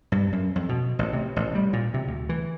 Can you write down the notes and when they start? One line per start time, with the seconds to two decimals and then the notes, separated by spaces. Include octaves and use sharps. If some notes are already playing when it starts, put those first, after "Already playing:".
0.12 G2
0.33 F#2
0.56 F2
0.69 B2
0.99 A1
1.13 C3
1.36 A1
1.55 G3
1.73 A#2
1.94 C3
2.07 D2
2.29 E3